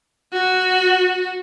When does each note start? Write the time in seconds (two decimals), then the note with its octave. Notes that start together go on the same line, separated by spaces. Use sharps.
0.33 F#4